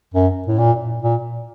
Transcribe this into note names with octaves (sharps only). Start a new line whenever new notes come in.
F#2
A2
A#2
A#2